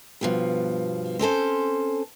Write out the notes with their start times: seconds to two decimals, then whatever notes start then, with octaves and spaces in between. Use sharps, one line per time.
0.21 G2 B2 F3
1.19 C4 C#4 A4 C5